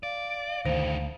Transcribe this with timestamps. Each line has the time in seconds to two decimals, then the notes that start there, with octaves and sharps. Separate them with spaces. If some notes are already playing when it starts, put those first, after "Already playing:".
0.03 D5 F5
0.65 D2 D#3 A3 C5